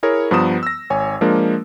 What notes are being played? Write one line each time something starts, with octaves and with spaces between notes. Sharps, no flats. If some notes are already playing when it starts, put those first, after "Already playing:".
E4 G#4 A#4 C#5
G2 F3 B3 A#5 D#6 E7
E6 A#6
G#1 C#5 G#5
F3 G#3 A#3 D4 A#4